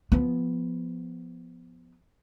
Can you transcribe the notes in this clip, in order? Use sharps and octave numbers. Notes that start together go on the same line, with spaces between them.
F3 B3